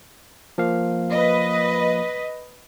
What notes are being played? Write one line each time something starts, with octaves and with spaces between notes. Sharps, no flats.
F3 A#3 F5
B4 D#5